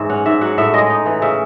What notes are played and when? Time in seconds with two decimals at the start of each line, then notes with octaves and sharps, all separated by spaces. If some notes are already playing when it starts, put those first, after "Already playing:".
Already playing: G#2 E3 C#5 E5
0.10 C#4 F#5
0.26 G#2 E5
0.41 F#3 F#5
0.58 A2 E5
0.74 G#3 D#5
0.90 D#4
1.06 E3
1.22 C#3 E5